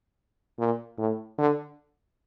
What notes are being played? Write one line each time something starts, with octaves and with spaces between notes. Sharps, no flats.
A#2
A2
D3